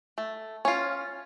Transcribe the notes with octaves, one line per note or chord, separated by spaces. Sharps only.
A3
C#4 F4